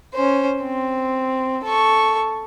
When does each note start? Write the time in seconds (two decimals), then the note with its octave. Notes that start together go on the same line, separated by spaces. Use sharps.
0.14 C#4 C5
0.62 C4
1.64 A4 C#6